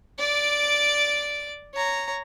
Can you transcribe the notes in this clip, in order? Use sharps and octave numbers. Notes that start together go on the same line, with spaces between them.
D5 D6
C#5 A#5